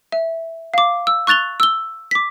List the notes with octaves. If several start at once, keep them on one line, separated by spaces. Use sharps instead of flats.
E5
F5 D6
E6
C#6 F#6 A6 F7 G7
E6 G7
D6 B6